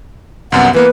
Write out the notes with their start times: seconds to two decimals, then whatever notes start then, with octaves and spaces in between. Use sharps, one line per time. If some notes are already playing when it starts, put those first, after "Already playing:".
0.52 C2 F#2 B3 F#5
0.74 E3 A#3 B3 B4